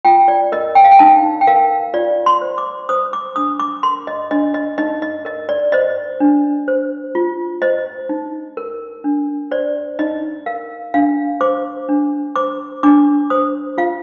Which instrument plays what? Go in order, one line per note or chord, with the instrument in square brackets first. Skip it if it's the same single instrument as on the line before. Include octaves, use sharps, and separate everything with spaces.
[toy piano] F4 G5
D5
A#4 D#5
G5
F5
G5
D#4 A5
G5
A#4 F5
F4 D5
C6
C5
D6
C5 D#6
D6
D4 D#6
D6
A#4 C6
D#5
D4 D#5
D#5
D#4 D#5
D#5
A#4 D#5
D5
C5 D#5
D4
C5
F4
C5 D#5
D#4
A#4
D4
C5 D5
D#4 D#5
A#4 F5
D4 F5
C5 D6
D4
C5 D6
D4 D6
C5 D#6
F4 F5